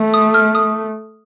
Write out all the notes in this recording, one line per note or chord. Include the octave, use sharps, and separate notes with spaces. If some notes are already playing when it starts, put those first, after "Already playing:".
Already playing: A3
D#6
F6
D#6